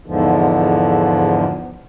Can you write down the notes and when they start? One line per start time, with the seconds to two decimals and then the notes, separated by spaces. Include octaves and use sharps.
0.06 E2 G#2 D3 F3